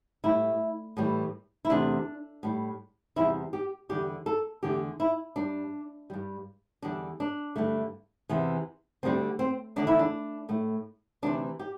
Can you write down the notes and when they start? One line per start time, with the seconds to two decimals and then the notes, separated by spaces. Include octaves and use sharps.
0.24 A2 G3 E4
0.97 A2 E3 G3
1.65 E4
1.70 E2 C3 A3 D4
2.43 A2 G3
3.16 E2 C3 G3 E4
3.53 G4
3.89 E2 D3 G3 G4
4.26 A4
4.63 E2 D3 A3 G4
5.00 E4
5.36 G2 G3 D4
6.10 G2 G3
6.82 E2 D3 G3 D4
7.20 D4
7.56 G2 D3 A3
8.29 E2 C3 E3
9.03 D2 D3 G3 C4
9.39 C4
9.76 E2 D3 A3 D4
9.87 E4
9.99 D4
10.49 A2 A3
11.22 D2 C3 E3 D4
11.59 G4